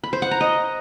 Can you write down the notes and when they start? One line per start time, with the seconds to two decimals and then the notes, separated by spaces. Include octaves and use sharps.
0.04 B5
0.13 C5
0.22 F#5
0.31 A#5
0.41 D#5